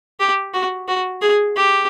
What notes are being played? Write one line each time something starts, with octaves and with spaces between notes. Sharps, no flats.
G4
F#4
F#4
G#4
G4